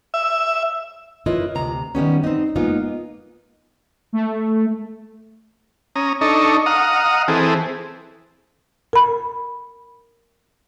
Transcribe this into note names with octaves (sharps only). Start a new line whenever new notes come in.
E5
E4 F4 A#4 B4 C#5 D#5
D2 C3 A#5
D#3 G3 B3 C#4
C4 D#4
G#3 A#3 B3 D#4 F4
A3
C#4 A#5 D#6
D4 D#4 A4 D#5 C#6
D#5 F5 F#5 A#5 D#6
E3 C4 G#4 A4
A#4 B5